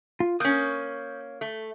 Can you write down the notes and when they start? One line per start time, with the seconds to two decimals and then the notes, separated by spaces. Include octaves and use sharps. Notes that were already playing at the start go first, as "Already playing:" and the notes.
0.20 F4
0.40 A#3 C#4 D#6 G6
1.41 A3